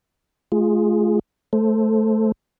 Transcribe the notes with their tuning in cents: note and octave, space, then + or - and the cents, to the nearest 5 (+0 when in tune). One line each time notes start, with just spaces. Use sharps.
A3 -45 F4 +0 G#4 +0
A3 -10 A4 +0 C5 +0